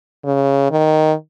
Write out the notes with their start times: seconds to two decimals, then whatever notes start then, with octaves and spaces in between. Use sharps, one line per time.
0.24 C#3
0.71 D#3